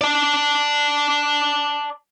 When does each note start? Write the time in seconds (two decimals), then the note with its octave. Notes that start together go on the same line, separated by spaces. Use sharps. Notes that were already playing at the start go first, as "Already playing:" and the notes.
0.01 D5 A5